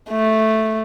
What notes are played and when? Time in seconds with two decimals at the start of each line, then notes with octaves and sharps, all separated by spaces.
0.10 A3